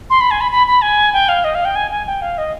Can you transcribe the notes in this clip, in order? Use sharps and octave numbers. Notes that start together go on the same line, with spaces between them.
C6
B5
G#5
B5
B5
B5
G#5
G5
F5
D#5
F5
G5
G#5
G#5
G5
F5
D#5